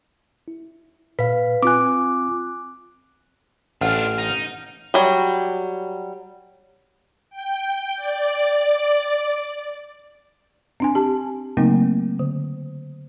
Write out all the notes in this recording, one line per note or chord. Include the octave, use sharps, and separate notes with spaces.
E4
A#2 B4 F5 B6
C4 F4 G#5 D6 F#6
A1 D4 F4 F5 F#5 F6
D#4
F#3 G3
G5
D5
C4 D4 G#5
G4 A5
C#3 F#3 A3 A#3 C4 D#4
D3